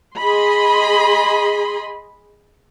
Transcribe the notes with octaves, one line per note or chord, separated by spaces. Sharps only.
G#4 D#5 B5 C6